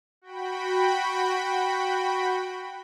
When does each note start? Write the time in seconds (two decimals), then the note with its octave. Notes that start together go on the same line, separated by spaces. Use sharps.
0.22 F#4 G5 B5